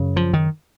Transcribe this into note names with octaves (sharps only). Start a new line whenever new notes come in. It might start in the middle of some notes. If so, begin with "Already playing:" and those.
Already playing: F#2 C#3
F3
D#3